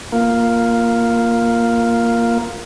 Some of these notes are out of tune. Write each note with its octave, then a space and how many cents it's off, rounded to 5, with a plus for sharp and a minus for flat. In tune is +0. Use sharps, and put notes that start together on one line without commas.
A#3 +0 F4 +0